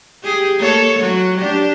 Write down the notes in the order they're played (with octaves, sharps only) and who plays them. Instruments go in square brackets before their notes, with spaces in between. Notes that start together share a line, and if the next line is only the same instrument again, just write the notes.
[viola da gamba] G4 G#4
A#3 A4 C#5
F#3 F#4
D4 G4